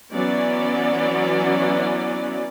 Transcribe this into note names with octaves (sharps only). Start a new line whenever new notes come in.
E3 F#3 B3 C#4 D5